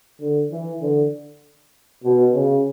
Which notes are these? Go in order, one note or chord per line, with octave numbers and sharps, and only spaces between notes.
D3
E3
D3
B2
C#3